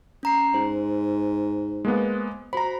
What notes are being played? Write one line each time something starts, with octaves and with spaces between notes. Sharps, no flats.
C#4 A#5 C7
G#2 C5
G#3 A#3 B3
F#4 C5 A#5 B5